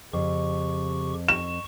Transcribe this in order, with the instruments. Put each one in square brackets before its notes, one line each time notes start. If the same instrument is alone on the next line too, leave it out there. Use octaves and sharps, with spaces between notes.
[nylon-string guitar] F2 [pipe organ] C#3 G4 C#6
[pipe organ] C#6 [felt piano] E7